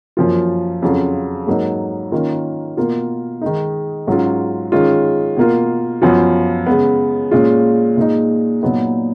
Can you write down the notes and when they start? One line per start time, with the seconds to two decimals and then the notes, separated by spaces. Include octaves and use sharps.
0.17 F#2 F3 A#3 F4
0.82 F2 C#3 F#3 C#4 F4
1.47 G#2 F#3 A#3 D#4
2.12 D#3 A#3 C#4 F4
2.77 B2 A#3 F4
3.41 D#3 G#3 D#4
4.07 G#2 F#3 C#4 F4
4.72 D#3 G#3 C#4 F4
5.36 B2 A#3 F4
6.02 F#2 F3 B3 F4
6.66 C#3 G#3 B3
7.31 A#2 G#3 C#4 F4
7.97 A#2 G#3 D#4
8.62 A#2 F#3 B3 D#4